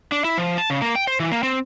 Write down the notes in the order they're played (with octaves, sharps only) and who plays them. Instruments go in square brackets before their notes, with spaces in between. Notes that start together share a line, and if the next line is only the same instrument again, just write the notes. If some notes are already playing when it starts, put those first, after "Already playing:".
[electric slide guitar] D4
E4
F3
A5
C#3
A#3
G5
C5
E3
A#3
C4